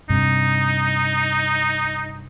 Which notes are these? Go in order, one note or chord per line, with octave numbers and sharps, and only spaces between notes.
G2 C3 D#4